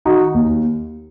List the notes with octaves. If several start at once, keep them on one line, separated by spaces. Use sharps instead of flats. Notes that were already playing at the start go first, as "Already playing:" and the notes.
D#3 D#4 F#4
D#2